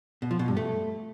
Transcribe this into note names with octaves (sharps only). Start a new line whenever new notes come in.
B2
F3
B2
G2
A3